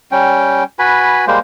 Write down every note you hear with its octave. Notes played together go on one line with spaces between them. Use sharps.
G3 C#4 G5
F#4 B4 G#5 B5
G3 G#3 A#3 C5